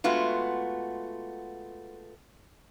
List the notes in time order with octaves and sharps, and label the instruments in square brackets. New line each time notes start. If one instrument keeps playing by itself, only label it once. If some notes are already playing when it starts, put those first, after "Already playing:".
[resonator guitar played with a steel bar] G#3 A3 B3 F4 F#4